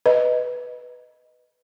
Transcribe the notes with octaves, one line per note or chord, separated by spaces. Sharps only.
B4 D#5